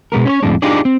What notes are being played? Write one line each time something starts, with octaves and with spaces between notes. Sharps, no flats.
B2 G#3 B3 A#4
C#4 C5 C#5
F2 A2 G#3 D4
D4 D#4 F4 G4 G#4 D5
C4